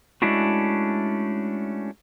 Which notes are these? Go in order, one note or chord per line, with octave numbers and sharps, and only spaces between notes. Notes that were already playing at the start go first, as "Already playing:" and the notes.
G#3 A3 C#4 D4 E4 F#4